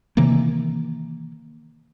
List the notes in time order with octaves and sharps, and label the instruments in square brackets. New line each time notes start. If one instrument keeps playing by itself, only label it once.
[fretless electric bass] C3 D#3 E3 A#3